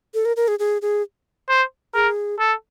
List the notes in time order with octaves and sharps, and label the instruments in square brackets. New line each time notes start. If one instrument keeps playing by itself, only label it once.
[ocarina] A4
A#4
A#4
G#4
G#4
G#4
[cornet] C5
[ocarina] G#4 [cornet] A#4
[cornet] A4